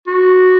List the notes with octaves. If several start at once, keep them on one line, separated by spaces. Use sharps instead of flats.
F#4